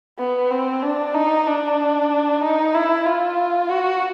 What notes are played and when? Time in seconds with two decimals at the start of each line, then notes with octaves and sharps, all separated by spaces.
0.19 B3
0.51 C4
0.82 D4
1.14 D#4
1.46 D4
2.43 D#4
2.74 E4
3.06 F4
3.69 F#4